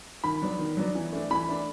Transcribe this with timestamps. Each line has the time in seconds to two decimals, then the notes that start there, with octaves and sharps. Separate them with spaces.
0.24 D#3 B5
0.42 F#3 B3 D4
0.59 D#3
0.77 F#3 B3 D4
0.95 E3
1.13 A3 D4
1.31 E3 B5
1.49 A3 D4